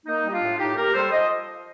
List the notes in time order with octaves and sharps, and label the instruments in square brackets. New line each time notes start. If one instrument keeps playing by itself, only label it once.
[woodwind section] A#3 D#4
G3 G4
D4 F4
A2
A2 D#4 G4
A4
A#3 G4 A#4
G3 A4 C5
F3 C5 D#5